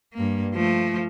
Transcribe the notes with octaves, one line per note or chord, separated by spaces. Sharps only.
G2 A#3
F3 A3